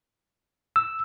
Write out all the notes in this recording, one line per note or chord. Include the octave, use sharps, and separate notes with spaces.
E6